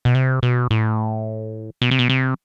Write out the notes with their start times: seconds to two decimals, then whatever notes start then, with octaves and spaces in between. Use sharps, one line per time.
0.05 B2
0.15 C3
0.43 B2
0.70 A2
1.82 B2
1.91 C3
1.99 B2
2.09 C3